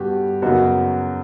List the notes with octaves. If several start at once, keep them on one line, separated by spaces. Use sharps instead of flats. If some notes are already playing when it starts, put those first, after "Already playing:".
Already playing: G2 D3 G3 B3 F#4 G4
F#2 C#3 F#3 B3 D#4 F#4